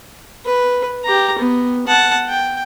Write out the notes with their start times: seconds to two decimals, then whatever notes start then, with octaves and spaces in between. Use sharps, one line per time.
0.45 B4
1.04 G4 A#5
1.38 B3
1.87 F#5 A5
2.29 G5